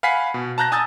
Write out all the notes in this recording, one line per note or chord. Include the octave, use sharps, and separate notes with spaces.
F5 F#5 G#5 B5 B6 C7
B2
A5 A#5 F#6 G6 A#6
G#5 A5 D#6 E6 G6 A6